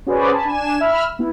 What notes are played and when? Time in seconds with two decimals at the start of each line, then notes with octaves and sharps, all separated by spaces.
0.06 C#4 F#4 G#4 B4 C5 D5
0.32 G#5 A5 B5
0.45 D4 G#5 E7
0.81 E5 B5 E6 F6
1.19 B3 E4